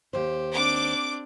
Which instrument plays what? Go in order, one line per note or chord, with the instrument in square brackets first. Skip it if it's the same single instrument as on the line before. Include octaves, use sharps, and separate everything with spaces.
[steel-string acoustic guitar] D#2 C5 [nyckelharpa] G4
[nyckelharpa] C4 D4 [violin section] D6